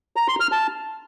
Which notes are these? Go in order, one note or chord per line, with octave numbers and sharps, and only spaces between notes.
A#5
C6
F6
A5